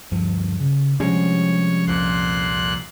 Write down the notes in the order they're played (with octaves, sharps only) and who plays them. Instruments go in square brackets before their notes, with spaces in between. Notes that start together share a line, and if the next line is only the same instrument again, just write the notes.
[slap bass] D2 G2 F3
C#3
[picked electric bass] C3 G3 G#3 [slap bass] F3 C#4 D4 [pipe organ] C#5
[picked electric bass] C2 F2 [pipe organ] A#2 C6 F#6